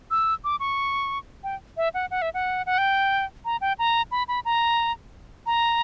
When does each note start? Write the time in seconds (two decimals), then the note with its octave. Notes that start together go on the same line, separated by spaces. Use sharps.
0.11 E6
0.44 D6
0.60 C#6
1.44 G5
1.77 E5
1.94 F#5
2.11 F#5
2.22 E5
2.34 F#5
2.66 F#5
2.78 G5
3.45 A#5
3.61 G5
3.79 A#5
4.11 B5
4.28 B5
4.45 A#5
5.46 A#5